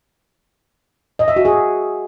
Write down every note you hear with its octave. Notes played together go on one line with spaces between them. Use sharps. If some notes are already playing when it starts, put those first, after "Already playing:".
D#5
E5
F#4
G#4